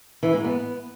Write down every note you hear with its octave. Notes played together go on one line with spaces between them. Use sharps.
E3
G#2
B3